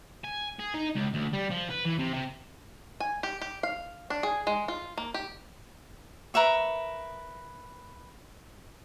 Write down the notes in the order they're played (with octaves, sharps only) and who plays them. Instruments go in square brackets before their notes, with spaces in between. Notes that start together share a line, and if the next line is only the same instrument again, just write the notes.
[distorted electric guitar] G#5
G#4
D#4
C#2
D2
G3
F3
B4
E3
C3
C3
[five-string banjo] G#5
G4
G4
F5
D4
G#4
G#3
F4
A#3
G4
[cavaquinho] A#4 B4 E5 C#6